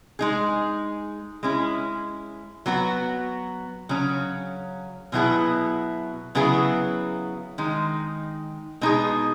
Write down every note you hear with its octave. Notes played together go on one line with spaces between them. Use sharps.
G#3 D#4 G#4
G#3 C#4 E4
F#3 B3 F#4
C#3 F#3 C#4
B2 F#3 B3 E4 G#4
C#3 F#3 B3 E4 G#4
D#3 G#3 D#4
B2 G#3 D#4 G#4